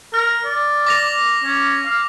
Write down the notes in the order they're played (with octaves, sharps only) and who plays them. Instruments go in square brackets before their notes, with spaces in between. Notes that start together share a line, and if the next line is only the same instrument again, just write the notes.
[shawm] A#4 [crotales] F6
[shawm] D5
[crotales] D6 A#6 F7
[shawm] C#4
F5